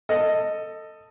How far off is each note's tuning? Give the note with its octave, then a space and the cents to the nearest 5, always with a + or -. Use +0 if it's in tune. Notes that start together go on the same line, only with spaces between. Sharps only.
A4 +20 D#5 +0